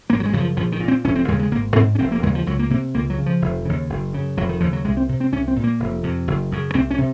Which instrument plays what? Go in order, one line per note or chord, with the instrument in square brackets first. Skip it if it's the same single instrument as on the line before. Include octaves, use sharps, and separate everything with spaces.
[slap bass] G#1 A#3
F#3
G#3
F#2 C#3 F#3
F3
A#1 F3
D#3
A#2
C4
F1 C#4
C4
D#2 C#3 G#3
G#3
G#1 A#3
G#2 C4
C#4
F1 C4
A#3
D#2 C#3 G#3
F3
C#2 F#3
A#3
C3 A#3
C#2 A#3
F#3
C#3
F3
F1
D#2 C#3
F#1
F#2 C#3
F1 F#3
D#3
D#2 C#3 F3
F#3
C2 G#3
C4
C3
C4
C2 C#4
C4
A#2
A#3
F1
F2 C3
F#1
F#2 C#3
C2 C4
C#4
C3